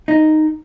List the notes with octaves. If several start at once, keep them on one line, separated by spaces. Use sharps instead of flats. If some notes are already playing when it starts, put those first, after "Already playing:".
D#4